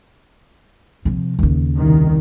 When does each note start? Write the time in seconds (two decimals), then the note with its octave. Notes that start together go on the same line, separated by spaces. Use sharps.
1.05 C3 F3
1.39 D#2 C#3
1.75 C2 D#3